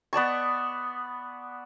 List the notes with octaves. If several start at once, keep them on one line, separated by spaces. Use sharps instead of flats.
B3 D5 A5 C#6